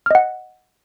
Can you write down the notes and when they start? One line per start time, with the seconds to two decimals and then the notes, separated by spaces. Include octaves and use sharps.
0.06 F6
0.11 D#5
0.15 F#5